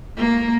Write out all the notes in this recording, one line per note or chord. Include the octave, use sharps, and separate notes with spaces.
A#3